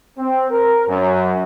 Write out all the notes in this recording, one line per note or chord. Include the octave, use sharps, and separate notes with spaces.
C4
A#4
F#2